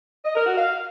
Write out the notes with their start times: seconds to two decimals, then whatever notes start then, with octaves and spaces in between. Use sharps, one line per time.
0.25 D#5
0.36 A#4
0.46 F#4
0.57 F5